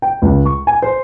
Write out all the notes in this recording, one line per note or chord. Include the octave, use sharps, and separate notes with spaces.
G5
C#2
C#6
G#5
C5